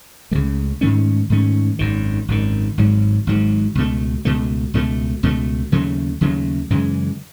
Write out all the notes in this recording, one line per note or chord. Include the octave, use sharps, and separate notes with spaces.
C#2 C#3 E3 A3
G#2 D#3 A3 C#4
G#2 D#3 A3 C#4
G#1 F#2 D#3
G#1 F#2 D#3
G#1 G#2 F#3
G#1 G#2 F#3
C#2 B2 A3
C#2 B2 A3
C#2 B2 F#3 A3
C#2 B2 F#3 A3
D#2 C#3 F#3 A3
D#2 C#3 F#3 A3
F#2 C#3 E3 G#3